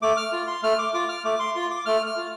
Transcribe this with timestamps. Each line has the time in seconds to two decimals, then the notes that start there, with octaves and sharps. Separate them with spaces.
0.02 A3 D6
0.17 F6
0.33 F4
0.47 C6
0.63 A3 F6
0.79 D6
0.94 F4 D6
1.09 F6
1.24 A3 D6
1.39 C6
1.55 F4 C6
1.70 D6
1.86 A3 F6
2.06 F6
2.17 F4